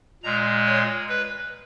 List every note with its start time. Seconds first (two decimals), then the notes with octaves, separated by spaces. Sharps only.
0.24 A#2 G#3 A#5
0.66 C#5
1.09 B4